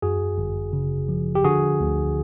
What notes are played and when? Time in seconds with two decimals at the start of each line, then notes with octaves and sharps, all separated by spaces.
0.02 F#2 F#4 G#4
0.38 G1
0.73 C#3
1.09 F3
1.35 G4
1.44 D3 F#4 G#4
1.80 D2